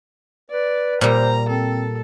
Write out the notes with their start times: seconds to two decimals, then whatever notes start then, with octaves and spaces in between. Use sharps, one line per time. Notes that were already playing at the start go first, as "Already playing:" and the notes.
0.50 B4 D5
1.01 A#2 G3 C5 A#5
1.49 C4 A4